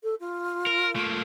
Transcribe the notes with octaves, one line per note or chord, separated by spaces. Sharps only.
A4
F4
A#4
A3 A#3